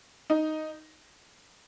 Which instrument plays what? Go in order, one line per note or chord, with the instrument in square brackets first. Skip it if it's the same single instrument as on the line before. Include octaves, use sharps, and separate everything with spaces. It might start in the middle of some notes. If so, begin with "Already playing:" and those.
[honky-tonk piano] D#4